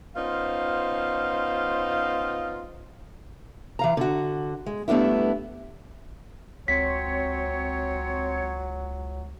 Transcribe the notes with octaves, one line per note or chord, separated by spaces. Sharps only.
B3 C#4 D#4 F4 C5 F5
E3 F5 A#5
D3 F#4
G#3
G2 A3 B3 D4 E4
C#2 F#3 C4 C#5 B6